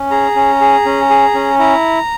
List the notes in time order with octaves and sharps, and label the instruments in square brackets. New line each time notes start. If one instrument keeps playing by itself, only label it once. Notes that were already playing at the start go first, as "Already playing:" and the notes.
Already playing: [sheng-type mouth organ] C#4
G#4 A#5
C#4
G#4
C#4
G#4
C#4
E4 A#5